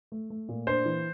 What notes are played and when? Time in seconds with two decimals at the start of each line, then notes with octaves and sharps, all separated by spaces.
0.12 A3
0.30 A3
0.48 A#2
0.67 D4 C5
0.86 E3